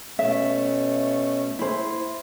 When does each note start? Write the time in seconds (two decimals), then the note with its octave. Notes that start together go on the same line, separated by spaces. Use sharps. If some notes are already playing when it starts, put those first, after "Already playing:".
0.19 B2 A3 C#4 E5
1.59 E4 C5